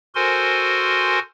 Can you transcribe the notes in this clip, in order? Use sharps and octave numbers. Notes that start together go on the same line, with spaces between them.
F#4 A4 A#4 C5 G#5 C6